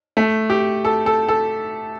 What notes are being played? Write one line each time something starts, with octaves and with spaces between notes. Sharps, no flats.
A3
G4
A4
A4
A4